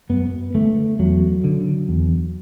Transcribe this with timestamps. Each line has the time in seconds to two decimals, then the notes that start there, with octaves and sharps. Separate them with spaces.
0.09 F#2 B3
0.54 D3 A3
0.99 E2 F#3
1.44 D3
1.89 E2